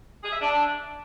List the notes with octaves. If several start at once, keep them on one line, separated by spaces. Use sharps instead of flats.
G#4
E5
D4